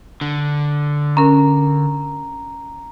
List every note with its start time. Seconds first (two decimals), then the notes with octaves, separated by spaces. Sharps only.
0.21 D3
1.17 C#4 A#4 A#5